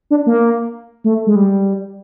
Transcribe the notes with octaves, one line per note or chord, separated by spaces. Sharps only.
D4
A#3
A3
G#3
G3